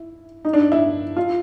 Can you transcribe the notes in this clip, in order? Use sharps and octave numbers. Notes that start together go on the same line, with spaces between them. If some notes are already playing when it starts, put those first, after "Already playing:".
Already playing: E4
D#4
D4
E4
F4